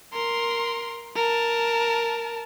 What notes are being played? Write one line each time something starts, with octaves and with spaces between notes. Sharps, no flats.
A#4 C6
A#4 A5